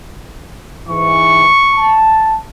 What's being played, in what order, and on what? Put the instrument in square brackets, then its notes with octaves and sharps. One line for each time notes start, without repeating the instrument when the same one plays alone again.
[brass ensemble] G#2 E3 [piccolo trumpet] C#6
[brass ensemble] A5